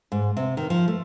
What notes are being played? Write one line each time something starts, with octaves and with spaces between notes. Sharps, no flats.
G#2
C3
D#3
F3
A3